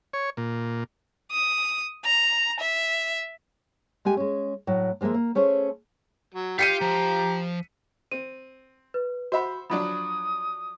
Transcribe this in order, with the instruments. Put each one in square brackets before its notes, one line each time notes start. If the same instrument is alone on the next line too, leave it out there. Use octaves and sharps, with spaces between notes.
[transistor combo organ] C#5
A#2
[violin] D#6
A#5
E5
[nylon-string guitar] G#3 A3 G4 G#5
G#3 C#4
A2 F#3
F3 G#3 A#3 A#4 E5
A#3
A3 C#4 G#4 C5 C#5
[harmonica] F#3
[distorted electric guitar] F4 F5 [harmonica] G4 [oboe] G5 [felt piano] B6 C#7 D#7
[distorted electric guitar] F3 [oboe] A#5
[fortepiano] C4 [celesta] D#7
[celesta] B4
[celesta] F#4 B5 [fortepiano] C5 E5 F#5
[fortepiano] F3 F#3 D4 [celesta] B5 [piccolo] D#6